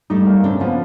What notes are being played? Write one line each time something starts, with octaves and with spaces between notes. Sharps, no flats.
G3 A3 D#4
A#3
C#3 C4 D4
F3 B3 C#4